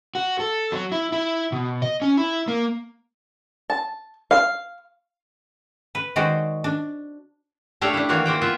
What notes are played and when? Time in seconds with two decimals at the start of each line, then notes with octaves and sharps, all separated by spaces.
0.15 F#4
0.40 A4
0.72 F#3
0.92 E4
1.12 E4
1.52 B2
1.82 D#5
2.02 C#4
2.17 E4
2.48 A#3
3.70 A5
4.31 F5
5.95 B4
6.16 D#3 G#3 F#4 C5 D5
6.64 D4
7.81 A3 D4 G4 A4 C#5 F5
7.94 D4 E4
8.09 D#3 E3 A#3 F#4 C#5 F5
8.26 E3 A#3 C5 G5
8.41 B3 F4 E5